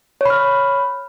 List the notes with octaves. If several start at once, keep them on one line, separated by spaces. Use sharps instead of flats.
C#5 B5 F6